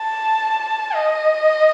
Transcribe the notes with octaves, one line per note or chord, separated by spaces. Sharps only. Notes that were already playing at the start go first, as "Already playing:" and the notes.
Already playing: A5
D#5